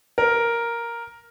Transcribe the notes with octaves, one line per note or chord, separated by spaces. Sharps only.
A#4